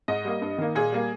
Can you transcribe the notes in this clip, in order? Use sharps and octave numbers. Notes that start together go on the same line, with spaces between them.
G#2 D#5
G3 A#3
G2
D#3 A#3
A#2 G#4
G3 A#3